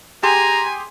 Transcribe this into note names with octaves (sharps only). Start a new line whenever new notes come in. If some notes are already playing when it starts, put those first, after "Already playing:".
G4 G#4 G#5 A#5 C6